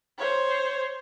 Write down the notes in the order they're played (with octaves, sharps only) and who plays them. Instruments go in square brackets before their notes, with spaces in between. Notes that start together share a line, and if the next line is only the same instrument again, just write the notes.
[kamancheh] C5 C#5